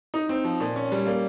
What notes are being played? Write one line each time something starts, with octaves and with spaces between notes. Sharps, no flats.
D#4
C4
F3
A#2
C#4
G3
A#3